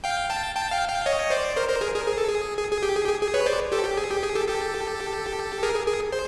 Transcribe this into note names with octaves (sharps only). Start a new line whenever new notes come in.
F5 G5
G5 A5
G5 A5
F5 G5
F5 G5
C#5 D#5
C5 D5
A#4 C5
A#4 C5
G#4 A#4
G#4 A#4
G#4
A4
G#4
G#4
G#4
G4
G#4
G4
G#4
G#4
B4 C#5
C5 D5
G4 A4
G4
G#4
G4
G#4
G4 A4
G4 A4
G#4 A#4
G#4
G#4
C5